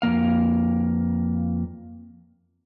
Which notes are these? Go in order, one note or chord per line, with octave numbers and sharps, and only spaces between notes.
F2 F3 A#3 F5